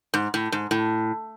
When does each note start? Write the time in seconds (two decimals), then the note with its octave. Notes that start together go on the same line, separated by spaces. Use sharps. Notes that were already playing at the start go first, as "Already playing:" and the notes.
0.14 G#2
0.34 A2
0.52 G#2
0.71 A2